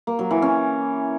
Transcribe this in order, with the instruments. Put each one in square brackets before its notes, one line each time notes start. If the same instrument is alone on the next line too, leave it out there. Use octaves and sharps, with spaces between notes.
[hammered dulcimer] A#3
F#3
E3
C#4